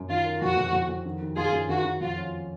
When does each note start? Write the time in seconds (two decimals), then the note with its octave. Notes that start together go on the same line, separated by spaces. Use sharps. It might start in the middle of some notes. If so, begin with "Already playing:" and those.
Already playing: F#2
0.09 D#3 F4
0.25 A#4
0.41 F2 F#4
0.57 F2
0.73 F2
0.89 F2
1.05 D#3
1.21 D#3
1.37 F#2 F4 G#4
1.53 F#2
1.69 D#3 F#4
1.85 D#3
2.01 F2 F4
2.18 C#4